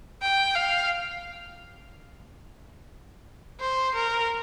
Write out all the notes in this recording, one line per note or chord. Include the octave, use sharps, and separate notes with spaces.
G5
F5
C5
A#4